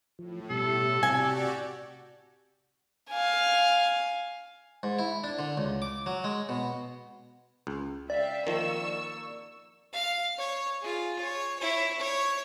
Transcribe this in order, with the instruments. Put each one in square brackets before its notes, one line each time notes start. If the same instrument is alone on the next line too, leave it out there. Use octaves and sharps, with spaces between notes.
[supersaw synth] A2 [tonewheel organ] F3
[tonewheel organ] B2 G3 [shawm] A4
[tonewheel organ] C3 [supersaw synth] F#4 G4 D5 [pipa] G#5
[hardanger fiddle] F5 G#5
[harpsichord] G#2
E4
D4
D3
C#2
D6
F#3
G#3
B2
[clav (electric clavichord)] C#2
[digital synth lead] D5 [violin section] E5 F5 G5
[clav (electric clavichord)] D#3 F3 [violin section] A#3 C#6 E6
[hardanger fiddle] F5
C#5
F4 G#4
C#5
E4 C#5
C#5